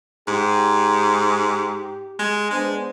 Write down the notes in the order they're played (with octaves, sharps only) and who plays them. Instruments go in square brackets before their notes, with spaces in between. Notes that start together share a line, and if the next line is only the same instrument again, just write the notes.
[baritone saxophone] G#2 [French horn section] G4
[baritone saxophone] G#3
[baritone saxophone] G#3 [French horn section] B3 D4 C5